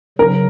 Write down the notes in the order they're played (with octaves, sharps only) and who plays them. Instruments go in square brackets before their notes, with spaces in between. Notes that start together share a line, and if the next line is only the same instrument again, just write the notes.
[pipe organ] C#3 F#3 [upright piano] A#4